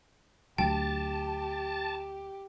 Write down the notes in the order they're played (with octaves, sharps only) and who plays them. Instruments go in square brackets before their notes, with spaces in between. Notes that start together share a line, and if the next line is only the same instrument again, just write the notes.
[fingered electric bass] D2 F#3 [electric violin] G4 [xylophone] G5 [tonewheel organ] A5